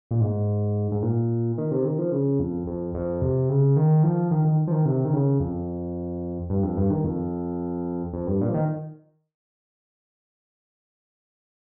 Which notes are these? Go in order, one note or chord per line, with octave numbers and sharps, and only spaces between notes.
A#2
G#2
G#2
A#2
D#3
C3
D#3
F3
C#3
F2
F2
F2
C3
C#3
D#3
F3
D#3
D#3
F3
D#3
C3
D#3
C#3
F2
G2
F2
G2
D#3
F2
F2
G2
A#2
F3
D#3